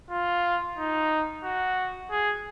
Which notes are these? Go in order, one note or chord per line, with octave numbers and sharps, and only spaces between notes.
F4
D#4
F#4
G#4